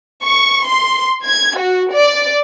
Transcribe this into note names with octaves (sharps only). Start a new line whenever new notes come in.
C#6
C6
G#6
F#4
D5